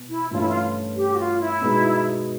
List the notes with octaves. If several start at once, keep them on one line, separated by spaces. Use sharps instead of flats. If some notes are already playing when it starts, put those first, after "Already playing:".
Already playing: B2
E4
G2 E3 A3 C#4 F4
E4
F4
G4
F#4
F4
E4
B2 G#3 B3 D#4 F#4